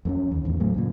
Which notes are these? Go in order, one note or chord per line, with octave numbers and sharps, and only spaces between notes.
F2 A#3 C#4
D#2
A1 E2 D3
A2 F#3 A3
C#2 F#2 A#2